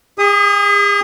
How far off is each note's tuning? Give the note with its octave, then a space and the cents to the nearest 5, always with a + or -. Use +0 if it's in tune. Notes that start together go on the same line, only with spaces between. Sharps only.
G#4 -45 D#6 +0